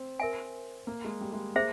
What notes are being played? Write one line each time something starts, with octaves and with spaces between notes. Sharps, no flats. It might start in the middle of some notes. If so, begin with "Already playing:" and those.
Already playing: C4
A#4 E5 G#5
A#3
G#3
G3
G#3
A#3 G#4 C5 E5